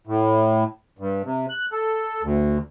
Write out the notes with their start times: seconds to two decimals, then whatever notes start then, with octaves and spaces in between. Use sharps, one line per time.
0.07 A2
0.99 G2
1.25 C3
1.49 F#6
1.72 A4
2.23 D2